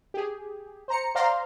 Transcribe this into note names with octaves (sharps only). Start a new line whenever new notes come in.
G4 G#4
C5 A#5 C#7
C5 D5 F5 A#5 C6